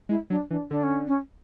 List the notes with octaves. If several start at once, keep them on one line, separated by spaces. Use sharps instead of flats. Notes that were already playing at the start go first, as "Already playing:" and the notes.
G#3 E4
F#3 D4
E3 D4
D3 D4
C#4
C#4